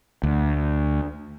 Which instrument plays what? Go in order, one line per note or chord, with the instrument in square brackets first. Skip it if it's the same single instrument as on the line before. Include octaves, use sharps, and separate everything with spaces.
[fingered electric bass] D2